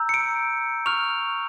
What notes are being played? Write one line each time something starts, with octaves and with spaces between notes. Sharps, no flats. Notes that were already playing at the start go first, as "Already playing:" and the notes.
Already playing: A#5 E6 G6
C#7
D7
C#6 F6 F7